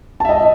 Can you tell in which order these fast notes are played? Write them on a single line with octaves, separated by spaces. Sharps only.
A5 E5 D#5